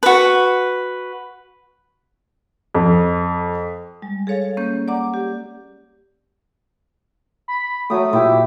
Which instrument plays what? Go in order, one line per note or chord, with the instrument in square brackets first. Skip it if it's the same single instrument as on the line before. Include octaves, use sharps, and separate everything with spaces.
[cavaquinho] F#4 B4
[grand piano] F2
[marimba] G3 G#3
G#4 A4 C#5 F5
A#3 C#4 G6
D5 F#5 A#5 D6
G4
[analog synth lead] B5
[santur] F#3 D#6 [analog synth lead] A3
[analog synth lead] A#2 [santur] E4 G4